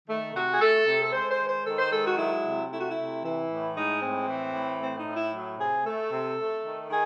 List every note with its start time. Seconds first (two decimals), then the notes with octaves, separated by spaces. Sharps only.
0.08 D#3 A3
0.34 C3 F#4
0.52 G#4
0.60 A3 A4
0.86 C3
1.03 A4
1.12 G#3 C5
1.30 C5
1.39 D#3
1.47 C5
1.65 D#3 A4
1.78 C5
1.91 G#3 A4
2.04 F#4
2.17 F#3 E4
2.44 C3
2.70 A3 E4
2.79 F#4
2.90 E4
2.96 C3
3.22 E3 E4
3.49 A2
3.75 G#3 D#4
4.01 A2 C4
4.27 E3
4.53 A2
4.79 A3 C4
4.97 D#4
5.06 A2
5.15 E4
5.33 F#3
5.58 C3 G#4
5.85 A3 A4
6.11 C3
6.38 A3
6.64 D#3
6.89 D#3 G#4